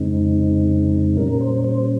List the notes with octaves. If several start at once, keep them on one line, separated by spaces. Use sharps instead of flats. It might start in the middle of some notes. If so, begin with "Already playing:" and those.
Already playing: F2 C#3 G#3 C4 D#4
A#2 G3 C#4 A#4
C5
C5